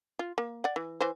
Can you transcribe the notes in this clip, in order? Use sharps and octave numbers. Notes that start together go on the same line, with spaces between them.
F4
A#3
D5 F#5
E3
E3 C5